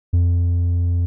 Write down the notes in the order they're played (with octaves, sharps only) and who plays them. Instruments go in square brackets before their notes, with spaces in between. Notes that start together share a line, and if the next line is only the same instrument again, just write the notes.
[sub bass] F2